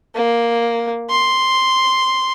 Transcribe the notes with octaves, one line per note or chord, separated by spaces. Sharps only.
A#3
C6